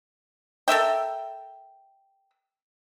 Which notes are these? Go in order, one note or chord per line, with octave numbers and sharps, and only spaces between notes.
A4 A#4 E5 G5